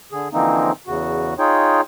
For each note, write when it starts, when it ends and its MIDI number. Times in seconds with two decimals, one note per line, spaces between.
0.12 0.28 50
0.12 0.28 68
0.33 0.72 50
0.33 0.72 52
0.33 0.72 53
0.33 0.72 58
0.33 0.72 60
0.33 0.72 63
0.87 1.34 40
0.87 1.34 49
0.87 1.34 66
1.39 1.81 63
1.39 1.81 65
1.39 1.81 68
1.39 1.81 73
1.39 1.81 79